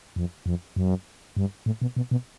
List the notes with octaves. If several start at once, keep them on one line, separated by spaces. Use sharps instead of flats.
F2
F2
F#2
G2
A2
B2
B2
B2